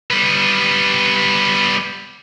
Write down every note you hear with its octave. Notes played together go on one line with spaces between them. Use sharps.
G3 B3